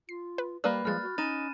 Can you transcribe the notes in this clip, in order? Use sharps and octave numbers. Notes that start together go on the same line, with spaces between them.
F4 C7
B4
G3 A#3 B4 D5 B5 D#6 F#6
F3 G3 G#3 F6 F#6 A6
F#4
C#4 D#4 A6 D#7 E7